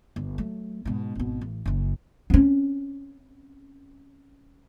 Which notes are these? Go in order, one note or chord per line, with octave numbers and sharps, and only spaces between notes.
G1
F#3 A3
G#2 B2
G#1 B2
A1
F#1 F#2
C4 C#4